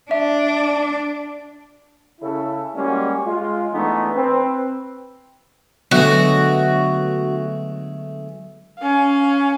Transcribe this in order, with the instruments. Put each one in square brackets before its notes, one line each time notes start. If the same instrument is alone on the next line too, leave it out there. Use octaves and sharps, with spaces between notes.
[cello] D4 [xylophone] E5
[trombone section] C#3 E4 A4
G3 G#3 A#3 C#4 F#4 G4
G#3 F4
E3 A3 B3 D4 D#4
C4 B4
[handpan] D3 F#3 B3 [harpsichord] G#3 A3 [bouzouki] F#4
[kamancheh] C#4 F5